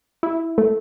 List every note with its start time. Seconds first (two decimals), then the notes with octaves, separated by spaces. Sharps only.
0.23 E4
0.58 A3